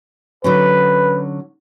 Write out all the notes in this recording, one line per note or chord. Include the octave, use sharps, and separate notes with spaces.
D3 F#3 C#4 B4